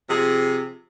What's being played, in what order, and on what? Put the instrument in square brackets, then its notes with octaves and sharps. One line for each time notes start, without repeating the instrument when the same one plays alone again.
[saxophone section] C3 F3 G#4